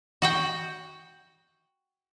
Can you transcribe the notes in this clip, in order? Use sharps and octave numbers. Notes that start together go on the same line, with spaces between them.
F#4 F#5 G5